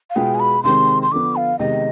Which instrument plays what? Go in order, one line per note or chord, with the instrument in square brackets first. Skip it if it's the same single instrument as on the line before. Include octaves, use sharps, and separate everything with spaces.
[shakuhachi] F5
[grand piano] B2 G#3 B3 F4 G#4 [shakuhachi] G5
[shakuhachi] G#5
B5
[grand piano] C3 D#3 G#3 C4 [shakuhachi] C6
[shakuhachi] C6
[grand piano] D3 F3 B3 [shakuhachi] D6
[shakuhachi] F5
[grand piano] C3 D#3 G#3 B3 [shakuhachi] D#5